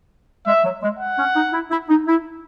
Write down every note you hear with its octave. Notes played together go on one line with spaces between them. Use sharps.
G#3 E5
F#3
G#3
F#5
C#4
D#4
E4
E4
D#4
E4